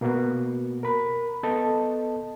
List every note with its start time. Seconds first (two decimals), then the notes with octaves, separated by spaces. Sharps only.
0.01 B2 A#3 B3 F#4
0.83 A#4 B5
1.43 B3 A4 D#5 A5